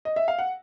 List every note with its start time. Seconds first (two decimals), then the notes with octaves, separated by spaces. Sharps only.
0.05 D#5
0.16 E5
0.28 F5
0.39 F#5